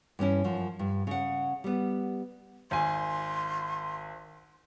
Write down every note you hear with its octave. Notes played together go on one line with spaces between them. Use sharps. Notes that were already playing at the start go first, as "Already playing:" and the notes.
G2 E3 C#4 E4
F#2 F3
G2
C#3 F#5
G3 B3
G#1 G#5 C6